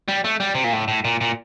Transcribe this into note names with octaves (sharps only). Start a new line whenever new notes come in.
G3
A3
G3
C3
A#2
A2
A2
A#2
A#2